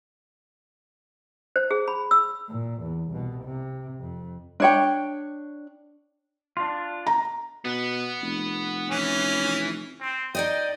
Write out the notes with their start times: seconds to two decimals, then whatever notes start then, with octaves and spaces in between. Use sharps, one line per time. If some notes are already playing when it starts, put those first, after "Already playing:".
1.56 C5
1.71 G#4
1.88 B5
2.11 E6
2.48 A#2
2.82 E2
3.10 C2 B2
3.45 C3
4.00 F2
4.60 D4 C#5 G5
6.57 D4 F4
7.07 A#5
7.65 B2 B3
8.21 F1
8.91 E3 C#4 B4
10.01 C4
10.35 D#4 D5 D#5 G5